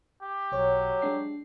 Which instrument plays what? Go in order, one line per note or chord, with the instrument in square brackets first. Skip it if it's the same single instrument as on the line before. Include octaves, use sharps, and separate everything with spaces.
[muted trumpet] G4
[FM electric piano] B1 C#5 [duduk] F#3
[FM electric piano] G#3 D4 C7